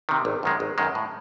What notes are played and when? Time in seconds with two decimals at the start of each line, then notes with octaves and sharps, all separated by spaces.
0.09 C3 D#3
0.25 G#1
0.43 F#2 D#3 G#3
0.60 G#1
0.78 F#2 D#3 G#3
0.95 A2